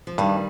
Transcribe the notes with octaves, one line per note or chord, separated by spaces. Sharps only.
F3
G2 D#3 G3